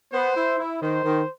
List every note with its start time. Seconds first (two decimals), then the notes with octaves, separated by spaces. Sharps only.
0.13 B3 C5
0.36 E4
0.58 E4
0.82 D#3 C5
1.04 D#3